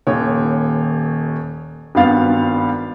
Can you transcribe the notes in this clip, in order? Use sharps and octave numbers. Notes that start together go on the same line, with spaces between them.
D#1 D#2 C#5
G#1 G2 B3 F5 A6